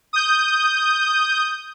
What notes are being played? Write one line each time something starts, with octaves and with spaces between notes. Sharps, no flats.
D#6 G6